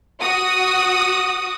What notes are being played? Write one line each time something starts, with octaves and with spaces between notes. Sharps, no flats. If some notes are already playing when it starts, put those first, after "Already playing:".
F#4 D#6